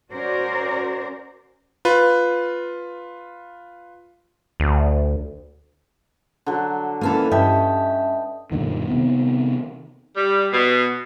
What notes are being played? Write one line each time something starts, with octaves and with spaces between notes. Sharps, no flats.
C#4 F#4 A#4 C5 D5
F4 B4
D2
D3 F#3
D3 E3 A#3 C#4 A4
G2 C#4 D#5 E5 G5 A5
F#2 A#2 D3 D#3
C3 D#3 B3 C4
G3
B2